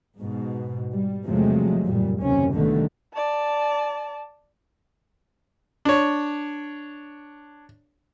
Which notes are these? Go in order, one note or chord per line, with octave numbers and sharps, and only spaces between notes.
G#2 B2
G3
E2 C3 F3 F#3 G#3 A3
F#1 A#2 G3
F#1 D#2 C3 C#4
C2 G#2 B2 D3 D#3 A3
D5 A5
D4 C#5